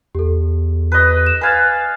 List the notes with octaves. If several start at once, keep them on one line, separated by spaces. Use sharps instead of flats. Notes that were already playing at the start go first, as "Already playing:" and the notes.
E2 G4 A4
B4 D#5
E7
B4 F5 G#5 G#6 A6